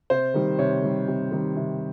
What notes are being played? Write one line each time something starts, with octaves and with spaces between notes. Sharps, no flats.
C3 C5
D#3 G3
C3 C#5
D#3 G3
C3
D#3 G3
C3